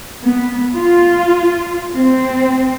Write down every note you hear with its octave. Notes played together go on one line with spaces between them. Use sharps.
B3
F4
C4